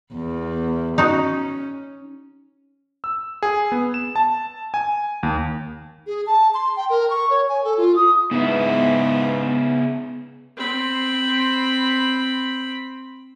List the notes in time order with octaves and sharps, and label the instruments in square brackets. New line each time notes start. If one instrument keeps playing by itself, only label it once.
[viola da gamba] E2
[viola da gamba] C#4 [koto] D#4 F#4
[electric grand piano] E6
G#4
B3
E7
A5
G#5
D#2
[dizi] G#4
A5
C6
G5
A#4
C#6
C#5
G#5
A4
F4
D#6
[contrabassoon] G#2 [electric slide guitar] C#3 E4 [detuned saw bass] B3
[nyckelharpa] C4 B5